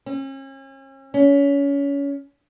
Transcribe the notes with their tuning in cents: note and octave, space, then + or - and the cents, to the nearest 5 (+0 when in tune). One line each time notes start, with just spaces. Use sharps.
C#4 -40
C#4 +25